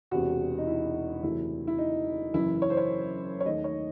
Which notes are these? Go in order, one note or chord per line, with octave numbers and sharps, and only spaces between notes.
E1 E2 C3 F#4
D#4
E4
F#1 E2 C3 F#3 A3 E4
E4
D#4
F#1 F#2 E3 E4
C#5
C5
C#5
C#5
D#2 D#3 A3 D#5
C#5